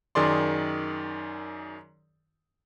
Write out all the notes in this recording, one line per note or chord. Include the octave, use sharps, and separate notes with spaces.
F#2 D#3 G#4 D5 C6